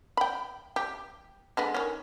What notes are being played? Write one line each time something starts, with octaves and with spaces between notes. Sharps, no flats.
G5 B5
G4
D3 G#3 B3
D#3 C#4